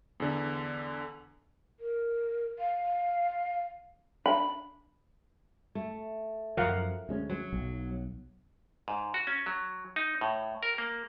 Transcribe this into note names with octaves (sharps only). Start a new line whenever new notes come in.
E2 D3
A#4
F5
D4 B5
A3
F#2 F3 F#3 A#4 F5 F#5
D2 G#3 C#4
F#3
B1
G#2
F#4
C#4
F#3
D#4
A2
A#4
A#3